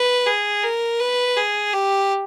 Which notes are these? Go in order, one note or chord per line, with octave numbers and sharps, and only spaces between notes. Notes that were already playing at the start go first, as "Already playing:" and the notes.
Already playing: B4
G#4
A#4
B4
G#4
G4